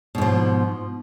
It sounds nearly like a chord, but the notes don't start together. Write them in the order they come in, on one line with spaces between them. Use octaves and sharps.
B2 G#2 F3